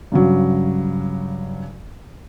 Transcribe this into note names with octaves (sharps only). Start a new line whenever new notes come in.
G2 C#3 F#3